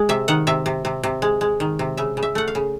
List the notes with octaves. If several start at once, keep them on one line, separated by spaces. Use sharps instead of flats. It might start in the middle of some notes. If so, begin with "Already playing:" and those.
Already playing: G#3
C3 E5
D#3 F#5
C3 E5
C3
C3
C3
G#3
G#3
D#3
C3
C#3 E5
C#3
E5
A3 F#5
F5
C#3